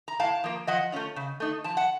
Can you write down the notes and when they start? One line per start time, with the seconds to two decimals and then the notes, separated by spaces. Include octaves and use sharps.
0.08 A#5
0.20 A2 F5 A5
0.44 F3 A#3
0.67 F3 D#5 F#5
0.92 A3 C#4 F4
1.16 C#3
1.40 A3 D#4
1.64 F3 A5
1.77 F#5